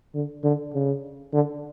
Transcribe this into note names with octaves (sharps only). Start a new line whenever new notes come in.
D3
D3
C#3
D3